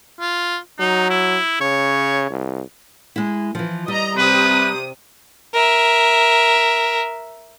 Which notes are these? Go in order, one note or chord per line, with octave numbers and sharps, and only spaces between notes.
F4
F#3 D#4
E4
C#3 C#5
C2
G#3 E4
E3 F3
G3 D#5 A#5
C3 B4 D#6
A#4 E5